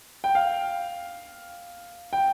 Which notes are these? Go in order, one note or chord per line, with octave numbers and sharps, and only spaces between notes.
G5
F5
G5